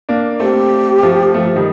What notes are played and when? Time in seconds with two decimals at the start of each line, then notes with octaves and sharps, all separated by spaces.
0.09 A#3 D4
0.40 A3 C4 G4
1.03 F3 A3
1.34 F3 A3
1.45 F3
1.56 D#3 G3